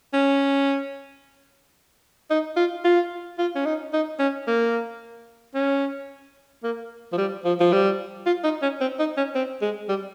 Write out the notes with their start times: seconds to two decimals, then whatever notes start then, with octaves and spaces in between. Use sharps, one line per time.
0.14 C#4
2.30 D#4
2.57 F4
2.85 F4
3.39 F4
3.56 C#4
3.66 D#4
3.93 D#4
4.19 C#4
4.48 A#3
5.55 C#4
6.63 A#3
7.13 F3
7.18 G3
7.45 F3
7.60 F3
7.73 G3
8.26 F4
8.44 D#4
8.62 C#4
8.81 C4
8.99 D#4
9.17 C#4
9.35 C4
9.62 G#3
9.89 G3